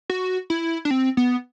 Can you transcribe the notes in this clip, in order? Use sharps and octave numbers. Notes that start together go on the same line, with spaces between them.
F#4
E4
D4
C4
B3